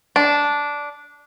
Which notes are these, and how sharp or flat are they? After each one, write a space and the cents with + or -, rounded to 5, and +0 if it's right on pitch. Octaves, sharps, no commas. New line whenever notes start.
D4 -10